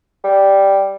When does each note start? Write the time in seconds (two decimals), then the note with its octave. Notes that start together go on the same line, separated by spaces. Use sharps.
0.24 G3